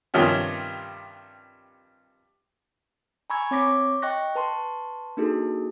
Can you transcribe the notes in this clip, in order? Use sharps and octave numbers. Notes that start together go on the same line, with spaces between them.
G2 C3 D#3 F3 C#4
G#5 A#5 B5 C#6 E6 G#6
C4 C#5 C#6 D6 A#6 B6
D#5 G5 C#6 F#6 A#6
B4 A5 C6 C#6
A#3 D4 D#4 F#4 G#4 A4